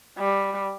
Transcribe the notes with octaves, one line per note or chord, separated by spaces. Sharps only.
G3